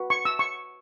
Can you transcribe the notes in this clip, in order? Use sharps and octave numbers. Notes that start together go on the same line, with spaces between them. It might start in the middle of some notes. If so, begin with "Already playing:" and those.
Already playing: F#4 B4
C#6
E6
C#6